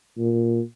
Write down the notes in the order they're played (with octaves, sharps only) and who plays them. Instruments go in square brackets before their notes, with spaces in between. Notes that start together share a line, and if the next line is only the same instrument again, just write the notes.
[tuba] A#2